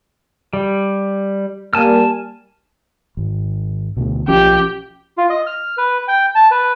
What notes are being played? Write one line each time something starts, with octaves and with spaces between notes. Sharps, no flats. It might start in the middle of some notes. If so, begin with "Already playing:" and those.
G3
G3 A#3 G#5 A5 F6
G#1
D2 B2
B1 F3 C#4 G4
F4
D#5
F6
B4
G5
A5
B4